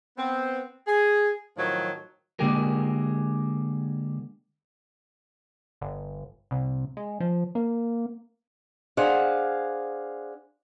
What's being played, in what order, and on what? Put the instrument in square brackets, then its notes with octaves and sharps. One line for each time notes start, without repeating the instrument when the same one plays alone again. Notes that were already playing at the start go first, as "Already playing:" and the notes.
[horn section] B3 C4
G#4
A2 D#3 F3 F#3
[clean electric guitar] D3 G#3 A#3 G4 G#4 A#4
[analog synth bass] G1
C2
G#3
F3
A#3
[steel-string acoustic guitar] D4 G#4 C5 F5 F#5